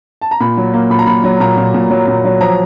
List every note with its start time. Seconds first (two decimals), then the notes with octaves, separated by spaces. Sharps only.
0.22 A5
0.31 A#5
0.40 A#2 B5
0.57 F#3
0.74 A#3
0.90 A#2 B5
0.99 A#5
1.06 A#2 B5
1.24 F#3
1.40 A#2 A#5
1.57 A#2
1.74 A#2
1.90 F#3
2.08 A#2
2.25 F#3
2.41 F3 A#5